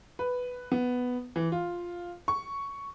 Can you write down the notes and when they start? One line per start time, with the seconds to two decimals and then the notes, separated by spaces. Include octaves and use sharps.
0.19 B4
0.72 B3
1.36 E3
1.52 F4
2.28 C#6